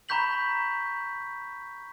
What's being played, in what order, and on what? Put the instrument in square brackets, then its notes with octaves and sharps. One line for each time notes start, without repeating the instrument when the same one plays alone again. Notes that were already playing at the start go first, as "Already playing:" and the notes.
[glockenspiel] A#5 B5 C#6 G6 B6 F#7